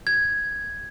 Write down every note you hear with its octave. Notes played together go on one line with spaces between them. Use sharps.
G#6